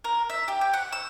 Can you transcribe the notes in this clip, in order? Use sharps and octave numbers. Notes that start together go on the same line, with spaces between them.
A#4
E5
G4
G5
F#5
E6